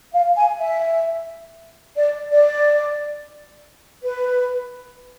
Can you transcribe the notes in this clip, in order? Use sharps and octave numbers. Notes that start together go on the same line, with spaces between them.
F5
G#5
E5
D5
D5
B4